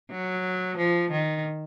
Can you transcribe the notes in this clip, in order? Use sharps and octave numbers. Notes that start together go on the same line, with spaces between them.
F#3
F3
D#3